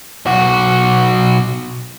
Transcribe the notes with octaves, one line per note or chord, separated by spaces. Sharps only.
B1 F#4